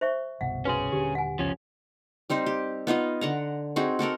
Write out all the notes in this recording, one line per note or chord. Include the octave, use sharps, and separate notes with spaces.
C5 E5 C#6
G1 C2 B2 F#5
C#4 F#4 G#4 B4
D#1 D3 G4
F#5 G#5
F#1 C#2 F3 C#4
G3 C4 D#4 C5
G4
B3 D#4 F4 D#5
D3 F#5 A#5
C4 D#4 F#4 G#4
F#4 A4 A#4 F#5